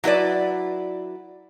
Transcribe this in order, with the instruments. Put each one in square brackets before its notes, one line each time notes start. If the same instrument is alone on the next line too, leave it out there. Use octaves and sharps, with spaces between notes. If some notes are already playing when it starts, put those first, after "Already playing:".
[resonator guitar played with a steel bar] F#3 E4 B4 D5